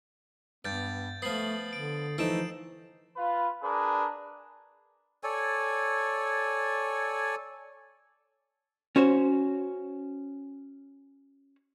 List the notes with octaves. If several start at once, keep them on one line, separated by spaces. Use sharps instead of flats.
G2 B3 G6 A6 D7
F3 A3 B3 D#6 C7 F#7
D3 D7
E3 F3 A3 D#4 E6 D7 E7
F4 B4
D4 G#4 A#4 B4
A4 C#5 D5 G#5
C#4 F#4 C5 C#5